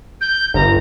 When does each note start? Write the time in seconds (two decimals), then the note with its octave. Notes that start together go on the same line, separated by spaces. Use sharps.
0.20 G6
0.54 G1 A#5